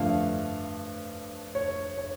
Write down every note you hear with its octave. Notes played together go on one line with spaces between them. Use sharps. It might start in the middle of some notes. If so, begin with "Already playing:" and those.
Already playing: G2 D3 F3 A3 D4 F5
C#5
C#5